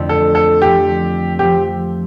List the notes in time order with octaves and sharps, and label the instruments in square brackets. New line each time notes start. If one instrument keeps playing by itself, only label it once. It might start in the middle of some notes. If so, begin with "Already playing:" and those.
Already playing: [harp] F2 D3 A3 E4
[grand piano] A4
A4
[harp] F3 A3 C4 [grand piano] G4
[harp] F3 A3 C4 [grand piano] G4